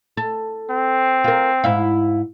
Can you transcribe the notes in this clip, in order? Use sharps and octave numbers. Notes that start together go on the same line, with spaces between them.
A4
C4
F4 A#4
G#2 E4 F5